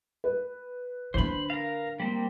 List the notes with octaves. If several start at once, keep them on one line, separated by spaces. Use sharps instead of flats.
B4
D3 D4 C5 B5
A#4 F5
G3 A#3 C4